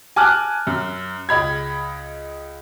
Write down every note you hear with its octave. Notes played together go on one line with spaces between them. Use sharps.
G#5 A5 D6 F6 F#6
F#2
C#2 D#5 B5 G#6